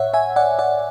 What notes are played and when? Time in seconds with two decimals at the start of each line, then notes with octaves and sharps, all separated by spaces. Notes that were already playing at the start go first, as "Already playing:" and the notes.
Already playing: A2 C#5 E5 F#5
0.14 E5 G#5
0.36 D5 F#5
0.59 D5 F#5